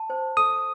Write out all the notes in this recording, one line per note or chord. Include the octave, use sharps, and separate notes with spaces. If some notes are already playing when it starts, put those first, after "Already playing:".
Already playing: A5
C5
A4 D#6